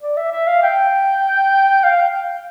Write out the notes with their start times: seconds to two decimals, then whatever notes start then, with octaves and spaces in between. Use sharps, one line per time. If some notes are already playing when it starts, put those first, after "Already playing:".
0.01 D5
0.17 E5
0.32 E5
0.47 F5
0.63 G5
1.84 F5